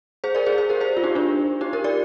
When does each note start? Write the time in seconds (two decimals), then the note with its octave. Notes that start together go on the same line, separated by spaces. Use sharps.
0.24 G#4 C5
0.35 A#4 D5
0.46 G#4 C5
0.58 G#4 C5
0.70 G4 A#4
0.81 G#4 C5
0.97 F4
1.04 D#4 G4
1.15 D4 F4
1.61 D#4 G4
1.73 G4 A#4
1.84 A#4 D5